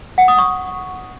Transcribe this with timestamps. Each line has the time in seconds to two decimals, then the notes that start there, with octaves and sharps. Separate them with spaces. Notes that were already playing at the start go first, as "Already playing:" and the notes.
0.18 F#5
0.28 D#6
0.38 C#6